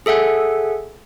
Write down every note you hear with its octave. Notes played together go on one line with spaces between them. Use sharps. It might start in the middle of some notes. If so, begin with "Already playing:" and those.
G#4 A4 E5 F#5 G#5